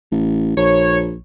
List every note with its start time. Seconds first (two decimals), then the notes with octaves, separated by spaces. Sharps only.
0.12 A1
0.57 A#1 C#5